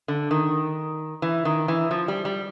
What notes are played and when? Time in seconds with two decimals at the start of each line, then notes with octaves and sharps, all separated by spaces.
0.08 D3
0.31 D#3
1.22 E3
1.45 D#3
1.68 E3
1.91 F3
2.08 G3
2.25 G3